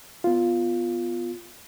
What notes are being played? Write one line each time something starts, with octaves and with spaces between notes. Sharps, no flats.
B3 F4